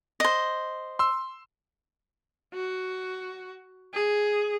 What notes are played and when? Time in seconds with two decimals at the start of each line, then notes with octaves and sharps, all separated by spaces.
0.20 C5 D#5
0.99 C6 E6
2.54 F#4
3.94 G#4